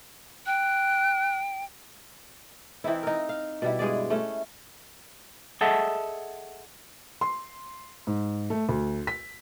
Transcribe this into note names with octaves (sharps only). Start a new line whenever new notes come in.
G5 F#6
E3 C4 D#4 E4
D#4 A#4
F5
B2 G3 E4
G2 G#3 G#4 D5
A3 C#4
G#4 A4 D#5 E5 F#5 A5
C6
G#2
A3
D2
B6